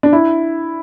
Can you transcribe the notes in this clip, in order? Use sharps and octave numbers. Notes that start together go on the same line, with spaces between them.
D4
E4